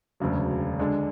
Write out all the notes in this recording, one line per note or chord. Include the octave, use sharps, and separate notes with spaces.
E1 D2 C#3 F#3
D3 G#3 D4